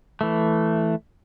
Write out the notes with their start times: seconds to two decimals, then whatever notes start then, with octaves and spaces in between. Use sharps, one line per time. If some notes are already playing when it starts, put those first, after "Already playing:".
0.21 E3 A3